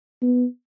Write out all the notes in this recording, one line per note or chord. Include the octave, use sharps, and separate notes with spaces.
B3